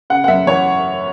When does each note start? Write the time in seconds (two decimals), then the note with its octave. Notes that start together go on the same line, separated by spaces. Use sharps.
0.10 C#3 F#5
0.24 F#5
0.28 F#2 E5
0.47 E3 C#5